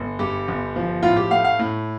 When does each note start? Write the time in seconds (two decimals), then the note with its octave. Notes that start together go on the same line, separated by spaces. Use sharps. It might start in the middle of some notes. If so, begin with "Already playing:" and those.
Already playing: G1
0.19 G2 G4
0.48 G1
0.76 F3
1.03 A2 F4
1.16 G4
1.31 A3 F5
1.45 F5
1.59 A2